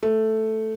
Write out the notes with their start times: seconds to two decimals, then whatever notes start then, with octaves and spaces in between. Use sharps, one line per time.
0.03 A3